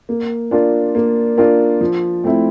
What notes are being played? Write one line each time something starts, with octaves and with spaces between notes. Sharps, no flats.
A#3
D4 F4 A#4
A#3
D4 F4 A#4
F3
A3 C4 E4